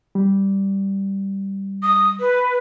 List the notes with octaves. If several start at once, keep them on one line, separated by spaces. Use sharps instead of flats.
G3
D#6
B4